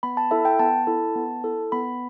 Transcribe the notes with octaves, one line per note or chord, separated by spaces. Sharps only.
B3 B5
A5
E4 A4 E5
G5
B3 A5
E4 A4
B3
E4 A4
B3 B5